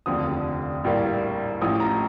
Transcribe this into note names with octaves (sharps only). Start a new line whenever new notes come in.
F1 D#2 D3 F3 D#6
A#1 A2 G3 A#3
A1 A2 F3 D#6
A#5